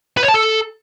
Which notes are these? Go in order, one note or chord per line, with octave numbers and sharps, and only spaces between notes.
B4
C#5
A5
A4